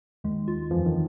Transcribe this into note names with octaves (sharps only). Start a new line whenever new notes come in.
D#2 D#3 G#3
F4
F2 E3 F3
D#3